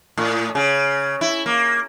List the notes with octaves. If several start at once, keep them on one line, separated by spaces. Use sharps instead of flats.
A2
C#3
E4
A#3